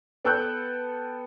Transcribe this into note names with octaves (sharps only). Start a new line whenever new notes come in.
B3 A4 G5 E6 F#6 G6